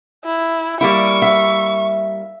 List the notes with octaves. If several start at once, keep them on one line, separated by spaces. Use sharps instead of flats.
E4
G3 A#3 E4 C#6
E5